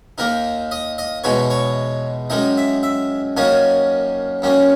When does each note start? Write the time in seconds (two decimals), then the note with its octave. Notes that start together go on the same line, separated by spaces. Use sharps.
0.18 D#2 D#3 A#3 D#4 A#4
0.71 D#5
0.98 D#5
1.24 E2 B2 G#3 D#4 C#5
1.50 C#5
2.30 F#2 D#3 G#3 D#4 D#5
2.57 E5
2.83 E5
3.37 F#2 D#3 A#3 C#4 G#5
4.42 F#2 D#3 A#3 C#4